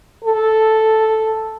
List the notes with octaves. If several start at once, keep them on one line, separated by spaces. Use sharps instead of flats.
A4